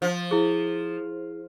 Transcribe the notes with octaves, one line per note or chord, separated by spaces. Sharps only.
F3
E4 G#4